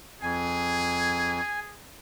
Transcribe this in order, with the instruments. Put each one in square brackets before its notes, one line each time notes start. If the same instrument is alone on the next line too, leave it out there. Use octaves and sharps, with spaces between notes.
[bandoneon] F2 [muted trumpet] G#4 [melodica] G#5